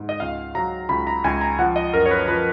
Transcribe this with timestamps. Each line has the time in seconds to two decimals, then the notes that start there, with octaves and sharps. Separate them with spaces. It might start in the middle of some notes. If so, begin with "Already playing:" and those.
Already playing: G#2
0.09 D#5
0.20 C#2 F5
0.55 F#3 A#5
0.89 C#2 B5
1.07 A#5
1.24 C#2 G#5
1.41 A#5
1.59 F3 F#5
1.76 D#5
1.93 F#2 A#4
2.06 C#5
2.11 B4
2.28 F3 B4